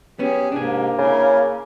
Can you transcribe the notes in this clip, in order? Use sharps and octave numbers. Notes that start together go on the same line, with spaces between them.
B3 C#4 G4 G#4
G#2 C3 A#3 D4 G#4
C#3 C#4 E4 A#4